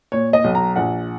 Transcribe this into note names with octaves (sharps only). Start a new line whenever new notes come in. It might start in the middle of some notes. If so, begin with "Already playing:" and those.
A#2 C#5
D#5
B1
A#5
A#1 F#5